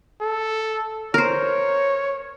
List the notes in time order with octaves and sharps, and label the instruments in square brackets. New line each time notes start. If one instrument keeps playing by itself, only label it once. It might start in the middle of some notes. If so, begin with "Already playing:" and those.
[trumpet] A4
[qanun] A#4 C5 [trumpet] C#5